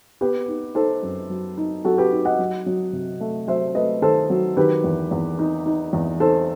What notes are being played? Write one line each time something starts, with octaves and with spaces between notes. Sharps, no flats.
B3 G4 B4
D#4
D#4 A4 C5
F#2
F#3
D#4
F#3 F#4 A4
G4 B4
D#4
D#5 F#5
F#3
F#3
C3
A3
F#3 C5 E5
A3 B4 D#5
D#3 A4 C5
F#3
D#3 G4 B4
E2
E2
D#4
D#4
E2
D#4 A4 C5